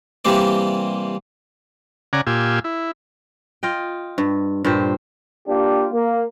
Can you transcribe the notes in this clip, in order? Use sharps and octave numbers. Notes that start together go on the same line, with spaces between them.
C3 E3 G3 A#3 C4 D5
C#3 D5 F#5 G#5 A#5
A#2 F4 G4 G#5 E6
E4
F4 D#5 G5
G2
G2 A#2 G4 C5
A#3 D4 F4 G4
A#3